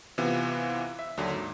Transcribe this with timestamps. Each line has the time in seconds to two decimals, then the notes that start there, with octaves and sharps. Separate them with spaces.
0.18 C3 E3 B3 F4
0.99 E5
1.17 D#2 D3 F#3
1.34 G#2